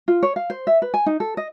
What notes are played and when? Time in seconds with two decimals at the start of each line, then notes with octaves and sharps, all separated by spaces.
0.08 F4
0.23 C#5
0.36 F5
0.50 C5
0.67 E5
0.82 B4
0.94 G#5
1.06 D#4
1.20 A4
1.37 D#5